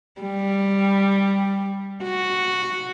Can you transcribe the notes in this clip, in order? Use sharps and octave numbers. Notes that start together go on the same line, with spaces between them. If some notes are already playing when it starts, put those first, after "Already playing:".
G3
F#4